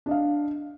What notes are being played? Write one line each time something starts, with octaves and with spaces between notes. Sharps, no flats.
D4 D#5 F5